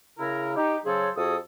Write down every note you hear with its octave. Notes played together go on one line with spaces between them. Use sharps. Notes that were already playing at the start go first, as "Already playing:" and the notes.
C#3 E4 A#4
D#4 G4
C#3 F#3 G#4 A4 C5 C#5
F2 F#4 G#4 A4 D#6